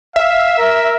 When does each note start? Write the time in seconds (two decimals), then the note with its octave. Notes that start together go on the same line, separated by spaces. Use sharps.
0.16 E5 F5
0.58 A#4